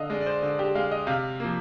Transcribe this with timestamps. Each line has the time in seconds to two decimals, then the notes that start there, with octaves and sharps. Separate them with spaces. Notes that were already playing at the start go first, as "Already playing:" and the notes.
Already playing: D3 D#5 F5
0.10 G#3 D5
0.21 D5
0.26 C5
0.42 D3 D5
0.59 G4
0.75 G#3 F5
0.91 D#5
1.07 C3 F5
1.40 F3 A#3